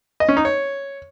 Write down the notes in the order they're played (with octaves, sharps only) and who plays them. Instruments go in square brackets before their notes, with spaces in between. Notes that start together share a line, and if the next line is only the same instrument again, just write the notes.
[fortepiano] D#5
C#4
D#4
C#5